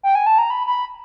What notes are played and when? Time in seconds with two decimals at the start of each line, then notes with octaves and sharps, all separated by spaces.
0.03 G5
0.15 G#5
0.27 A5
0.38 A#5
0.50 B5
0.67 B5